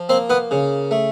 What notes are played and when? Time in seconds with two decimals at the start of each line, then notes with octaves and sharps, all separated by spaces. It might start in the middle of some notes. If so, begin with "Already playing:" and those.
Already playing: F3
0.09 A#3 C4 C5
0.30 B3 B4
0.51 C#3
0.91 A3